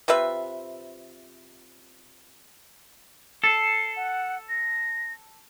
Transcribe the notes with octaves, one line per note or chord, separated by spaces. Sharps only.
C3 F4 B4 E5
A4 C7
F#5
A#6